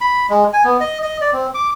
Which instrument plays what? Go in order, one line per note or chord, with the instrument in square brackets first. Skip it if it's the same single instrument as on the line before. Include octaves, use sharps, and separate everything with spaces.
[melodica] B5
G#3
G#5
B3
D#5
D#5
D5
C4
D6